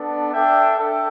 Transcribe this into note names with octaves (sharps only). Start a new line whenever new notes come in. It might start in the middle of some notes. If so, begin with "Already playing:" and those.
Already playing: B3 D4 A4 D5
D4 A4 E5 G5
D4 A4 E5 G5